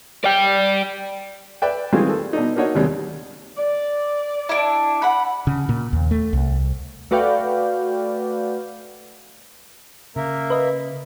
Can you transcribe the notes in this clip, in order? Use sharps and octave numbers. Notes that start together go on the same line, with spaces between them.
D5 G5
B4 D5 E5 G5
D#3 E3 G3 G#3 C4 F4
A4
B2 D4 D#4
A#3 D4 D#4 F#4 C#5
D#2 C3 G3 G#3
D5
D4 E4
F#5 B5
C#3
A#2
D#2
A3
C2
A3 F#4 B4 D5 F5 G5
C#3 A#3 A#4 E5
B4 D#5